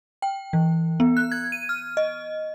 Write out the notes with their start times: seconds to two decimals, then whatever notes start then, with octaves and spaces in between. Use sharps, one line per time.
0.22 G5
0.53 E3
1.00 B3
1.17 F#6
1.32 G#6
1.52 D#7
1.69 F6
1.97 D#5